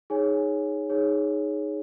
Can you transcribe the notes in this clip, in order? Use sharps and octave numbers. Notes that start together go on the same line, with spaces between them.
D#4 G#4 C#5 G#5
D#4 G#4 C#5